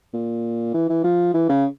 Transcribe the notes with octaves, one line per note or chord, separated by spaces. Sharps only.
A#2
E3
E3
F3
E3
C#3